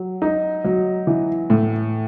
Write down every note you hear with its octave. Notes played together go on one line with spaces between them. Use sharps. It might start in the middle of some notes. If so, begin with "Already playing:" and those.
Already playing: F#3
D#4
F#3
E3
A2